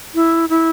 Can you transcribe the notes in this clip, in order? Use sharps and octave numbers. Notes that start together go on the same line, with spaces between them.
E4
E4